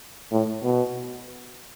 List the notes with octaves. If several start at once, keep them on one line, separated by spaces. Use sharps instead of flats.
A2
B2